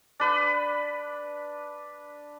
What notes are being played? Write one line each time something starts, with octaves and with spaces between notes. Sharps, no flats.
D4 B4